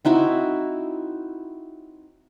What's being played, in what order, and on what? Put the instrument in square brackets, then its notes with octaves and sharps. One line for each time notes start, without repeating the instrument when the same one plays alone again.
[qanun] C4 D#4 E4 F#4